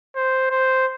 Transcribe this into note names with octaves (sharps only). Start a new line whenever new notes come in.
C5
C5